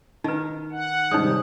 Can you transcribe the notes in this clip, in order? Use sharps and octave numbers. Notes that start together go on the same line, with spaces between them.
D#3 D#4 B4
F#5
G#2 C3 D#3 G3 D#4 C#5 D#6